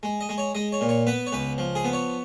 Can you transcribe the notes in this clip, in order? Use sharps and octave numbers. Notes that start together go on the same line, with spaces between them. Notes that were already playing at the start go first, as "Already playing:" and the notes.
G#3
D#5
G#3
C#5
G#3 D#5
C#5
A#2
C#5
B3 B4
C#5
C#2 B4
F3
G#4
B3
C#5